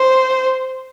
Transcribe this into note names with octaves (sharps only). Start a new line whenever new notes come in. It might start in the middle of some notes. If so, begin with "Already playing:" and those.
Already playing: C5